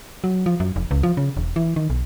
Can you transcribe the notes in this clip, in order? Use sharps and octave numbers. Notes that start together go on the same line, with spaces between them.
F#3
F3
F#2
F1
C#2
F3
C#3
E1
E3
D#3
B1